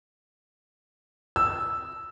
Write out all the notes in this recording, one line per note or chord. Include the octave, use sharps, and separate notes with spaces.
E6